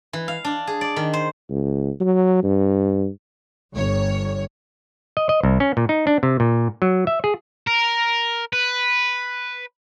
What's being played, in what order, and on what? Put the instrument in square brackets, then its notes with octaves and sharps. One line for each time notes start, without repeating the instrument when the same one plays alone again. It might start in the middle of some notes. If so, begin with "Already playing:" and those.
[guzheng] E3
F5
D4
G#4
D5
D#3
C5
[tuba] C#2
F#3
G2
[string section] G1 C#5
[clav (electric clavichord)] D#5
D#5
C2
C#4
A#2
D#4
D4
C3
A#2
F#3
E5
G#4
[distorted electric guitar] A#4
B4